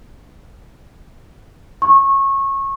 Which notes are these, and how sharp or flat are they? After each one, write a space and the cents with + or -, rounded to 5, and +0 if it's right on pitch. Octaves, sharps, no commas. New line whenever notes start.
C#6 -25